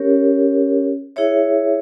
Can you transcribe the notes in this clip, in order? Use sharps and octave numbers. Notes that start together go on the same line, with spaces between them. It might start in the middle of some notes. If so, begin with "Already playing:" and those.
Already playing: C#4 G4 A#4 C#5
E4 G#4 C#5 E5